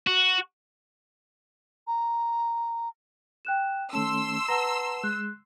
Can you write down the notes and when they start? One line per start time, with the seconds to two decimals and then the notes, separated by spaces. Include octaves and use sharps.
0.07 F#4
1.87 A#5
3.45 G5 F#6 E7
3.93 D#3 A3 C#4 A5 C6 E6
4.48 B4 F#5 A5 A#5
5.04 G#3 F#6